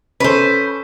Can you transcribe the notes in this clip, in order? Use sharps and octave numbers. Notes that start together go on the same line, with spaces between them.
C#4 A4 B4 C5